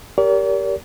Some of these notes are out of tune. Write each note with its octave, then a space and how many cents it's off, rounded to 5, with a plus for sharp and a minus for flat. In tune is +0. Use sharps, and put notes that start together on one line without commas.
G4 +0 A#4 +0 D5 -45